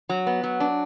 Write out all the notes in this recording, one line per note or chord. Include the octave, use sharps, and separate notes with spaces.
F#3
B3
F#3
D4